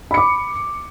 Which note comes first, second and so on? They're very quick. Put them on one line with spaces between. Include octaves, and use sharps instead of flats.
B5 C#7 D6